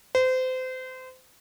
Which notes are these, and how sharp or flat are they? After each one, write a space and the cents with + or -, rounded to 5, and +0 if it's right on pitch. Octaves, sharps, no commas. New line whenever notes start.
C5 -30